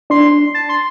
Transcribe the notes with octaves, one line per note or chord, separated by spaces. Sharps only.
D4 C6
A5
C6